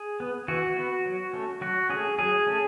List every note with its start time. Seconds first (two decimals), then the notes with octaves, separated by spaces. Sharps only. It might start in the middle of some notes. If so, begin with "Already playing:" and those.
Already playing: G#4
0.20 B3
0.48 E3 F#4
0.77 B3
1.06 F#3
1.33 A3 C#4
1.61 F#3 F#4
1.90 A3 C#4 G#4
2.19 F#3 G#4
2.47 A3 C#4